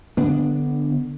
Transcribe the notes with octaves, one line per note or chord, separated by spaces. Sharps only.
D3 B3 D4